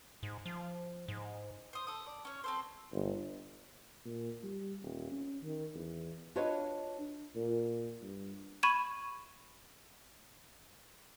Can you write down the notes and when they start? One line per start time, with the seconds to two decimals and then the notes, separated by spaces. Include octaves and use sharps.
0.23 G#2
0.46 F3
1.08 G#2
1.73 C5 D#6
1.87 A4 D#6
2.06 D5
2.25 C#4 C#5
2.44 C4 A4 C5
2.93 G1
4.05 A#2
4.43 G3
4.82 D#1
5.11 C#4
5.43 D#3
5.75 E2
6.35 D4 F4 F#4 B4 C#5 D#5
7.36 A#2
8.02 G2
8.63 B5 C#6 G#6 D#7 E7